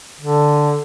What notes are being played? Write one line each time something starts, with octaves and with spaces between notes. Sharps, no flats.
D3